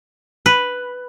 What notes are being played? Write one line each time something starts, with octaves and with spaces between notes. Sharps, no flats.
B4